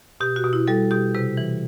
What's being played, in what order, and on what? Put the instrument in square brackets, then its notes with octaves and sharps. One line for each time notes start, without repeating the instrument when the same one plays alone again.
[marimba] B2 G4
F#4
B2
E4
G3 A4
B2 G4
C3 B4
E3